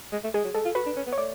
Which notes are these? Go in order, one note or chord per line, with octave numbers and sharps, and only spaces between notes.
G#3
A3
G#3 G#4
F#3
G#3 A4
F4
F#4 B4
D4
C#4
B3
C#5
A3 D5